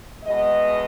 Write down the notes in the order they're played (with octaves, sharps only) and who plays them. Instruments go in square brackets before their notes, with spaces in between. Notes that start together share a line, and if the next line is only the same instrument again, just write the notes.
[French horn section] E2 B2 G#3 B3 D#5